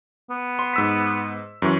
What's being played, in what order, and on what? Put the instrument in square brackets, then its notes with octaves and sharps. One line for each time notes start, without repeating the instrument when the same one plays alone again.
[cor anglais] B3
[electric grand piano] C6
G#2 E6 B6
F#2 E3 C#6